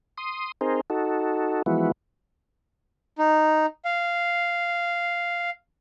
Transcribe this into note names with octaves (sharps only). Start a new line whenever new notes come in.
C6 D#6
C4 D#4 G#4 A#4 C5
D#4 F#4 A4
E3 F3 G#3 B3 E4 F#4
D#4
F5